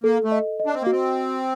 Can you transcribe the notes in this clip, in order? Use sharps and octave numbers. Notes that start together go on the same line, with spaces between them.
A#3 A4
A3
D#5
D#5
D4
C4
A#3
F#4
C4